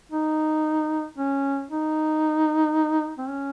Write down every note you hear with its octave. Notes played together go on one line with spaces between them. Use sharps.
D#4
C#4
D#4
C4
C#4